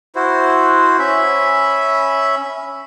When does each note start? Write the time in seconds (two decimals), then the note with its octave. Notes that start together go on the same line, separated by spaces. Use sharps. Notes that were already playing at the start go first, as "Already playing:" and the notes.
0.15 E4 F#4 C5
0.99 C#4 E5 B5